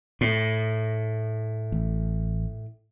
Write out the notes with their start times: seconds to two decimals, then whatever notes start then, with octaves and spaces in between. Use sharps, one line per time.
0.21 A2
1.72 A1